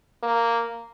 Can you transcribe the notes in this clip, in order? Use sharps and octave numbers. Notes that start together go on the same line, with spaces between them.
A#3